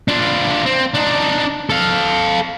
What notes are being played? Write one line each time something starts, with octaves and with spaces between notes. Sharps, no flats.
D4 F4
C4
D4 D#4
A4 F5